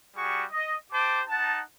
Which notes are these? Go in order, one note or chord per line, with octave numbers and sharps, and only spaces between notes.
G3 F#4 G#4 C#6
D#5
G4 C5 A5 D6
D#4 F#5 A5